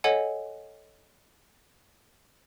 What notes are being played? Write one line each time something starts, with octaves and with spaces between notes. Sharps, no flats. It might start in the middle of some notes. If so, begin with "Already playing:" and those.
A4 C#5 D#5 F#5 G#5